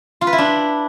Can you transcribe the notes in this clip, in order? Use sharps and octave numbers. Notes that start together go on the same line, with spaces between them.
F4
B4
E4
D4